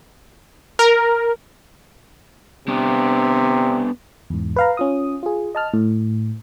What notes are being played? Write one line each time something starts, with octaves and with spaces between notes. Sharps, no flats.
A#4
C3 B3 D4
E2 G#2
B4 F5 A#5
C#4 F4 D#6
F4 G#4
D#5 A5 F6
A2